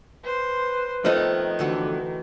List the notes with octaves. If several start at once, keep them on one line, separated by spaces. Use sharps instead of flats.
B4 C5
D#3 F3 A3 B3 C4 D#4
D2 D3 E3 F#4